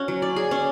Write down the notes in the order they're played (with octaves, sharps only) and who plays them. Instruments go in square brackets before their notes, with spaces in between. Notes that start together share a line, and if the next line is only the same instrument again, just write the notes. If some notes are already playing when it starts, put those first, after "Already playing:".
Already playing: [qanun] C#4 F#4
F#3
D5
G#4
C#4